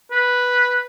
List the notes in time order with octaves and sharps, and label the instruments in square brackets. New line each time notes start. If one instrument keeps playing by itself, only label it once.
[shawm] B4